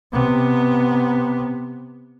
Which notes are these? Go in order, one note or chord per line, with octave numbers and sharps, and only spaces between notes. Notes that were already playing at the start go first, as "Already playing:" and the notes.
C3 B3